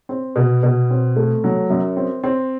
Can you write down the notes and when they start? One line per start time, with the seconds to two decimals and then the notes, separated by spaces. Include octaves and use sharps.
0.09 C4
0.36 B2
0.63 B2
0.90 C4
1.16 A3
1.44 F#3
1.70 F#2
1.97 C4
2.24 C4